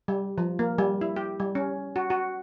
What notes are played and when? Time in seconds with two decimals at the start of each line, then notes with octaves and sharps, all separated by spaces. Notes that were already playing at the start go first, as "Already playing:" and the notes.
0.08 G3
0.38 F3
0.59 A#3
0.78 G3
1.01 E4
1.16 G4
1.40 G3
1.55 C#4
1.96 F#4
2.10 F#4